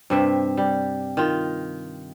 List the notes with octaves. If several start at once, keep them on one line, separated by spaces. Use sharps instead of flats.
G2 C3 E5
G3
D#3 F4